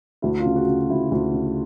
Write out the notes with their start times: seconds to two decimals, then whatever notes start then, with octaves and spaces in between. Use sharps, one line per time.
0.22 D2 E4
0.39 F4
0.46 C#3
0.56 F#4
0.68 C#3
0.90 D2 E4
1.12 D2
1.34 C#3